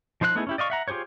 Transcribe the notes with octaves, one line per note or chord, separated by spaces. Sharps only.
F3 D#4 C5 F5 F#6
A3 B3 D#4 E4 G#4
C#4 E4 G4
D5 D#5 F5 C#6
E5 F#5 A#5
F4 G4 G#4 C5 C#5